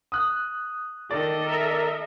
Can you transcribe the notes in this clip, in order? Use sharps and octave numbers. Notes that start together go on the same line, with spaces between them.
D#6 F#6
D#3 A4 D5 D#5
A#4 E5